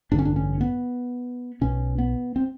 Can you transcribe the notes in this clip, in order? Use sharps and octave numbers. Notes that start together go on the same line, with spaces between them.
A1 G2 D3 D4
C#4
D4
C#4
B3
B1 B2 C#4
B3
C4